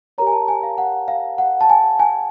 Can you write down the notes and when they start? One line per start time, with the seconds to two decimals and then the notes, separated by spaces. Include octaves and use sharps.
0.18 G4 A#4 C#5 A#5
0.27 G#5
0.32 A5
0.48 G#5
0.63 F5
0.78 F#5
1.08 F5
1.38 F#5
1.61 A5
1.70 G#5
1.99 G#5